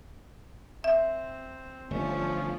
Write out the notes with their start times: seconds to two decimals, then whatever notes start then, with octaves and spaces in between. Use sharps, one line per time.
0.84 C4 E5
1.90 G1 F3 A3 C#4